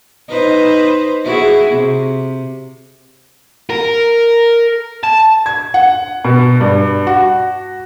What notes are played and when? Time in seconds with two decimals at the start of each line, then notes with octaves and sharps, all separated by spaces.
0.28 D#4 B4 C5
1.24 E4 F#4 G#4
1.70 C3
3.70 A#4
5.03 A5
5.46 G#6
5.74 F#5
6.25 B2
6.61 G2
7.07 F#4